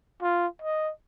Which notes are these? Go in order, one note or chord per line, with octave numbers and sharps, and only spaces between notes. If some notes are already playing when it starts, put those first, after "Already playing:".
F4
D#5